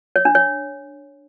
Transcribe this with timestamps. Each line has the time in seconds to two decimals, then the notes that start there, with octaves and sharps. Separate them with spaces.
0.16 C#5
0.25 D4
0.35 C#5